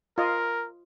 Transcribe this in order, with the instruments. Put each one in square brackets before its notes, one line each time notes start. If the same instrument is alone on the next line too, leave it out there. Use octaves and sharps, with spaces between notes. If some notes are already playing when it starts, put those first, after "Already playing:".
[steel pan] F4 D#5 [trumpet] A#4